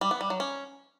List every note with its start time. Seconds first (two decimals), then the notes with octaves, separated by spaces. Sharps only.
0.01 G3
0.11 B3
0.21 G3
0.30 F#3
0.40 C#4